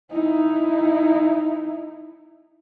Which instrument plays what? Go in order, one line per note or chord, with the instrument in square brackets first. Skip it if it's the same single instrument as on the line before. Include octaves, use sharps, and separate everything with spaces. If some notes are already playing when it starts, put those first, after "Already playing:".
[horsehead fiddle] D#4 E4